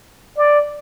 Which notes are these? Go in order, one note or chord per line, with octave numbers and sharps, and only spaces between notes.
D5